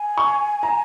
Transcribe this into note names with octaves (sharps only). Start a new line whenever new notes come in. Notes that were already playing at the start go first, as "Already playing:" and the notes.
Already playing: G#5
C#6
A#5